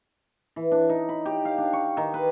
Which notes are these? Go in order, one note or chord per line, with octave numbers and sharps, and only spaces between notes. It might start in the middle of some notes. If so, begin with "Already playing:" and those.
E3
D4
D#4
B5
G4
F5
D4
C#6
D#3
B4